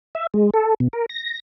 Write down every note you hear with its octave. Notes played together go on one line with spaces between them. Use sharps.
E5
G#3
A4
B2
A#4
A#6